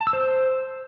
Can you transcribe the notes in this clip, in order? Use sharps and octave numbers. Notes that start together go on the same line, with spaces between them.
A5
E6
C5